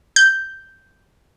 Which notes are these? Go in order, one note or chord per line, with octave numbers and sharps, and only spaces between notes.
G6